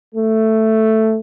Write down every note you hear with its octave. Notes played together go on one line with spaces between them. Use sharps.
A3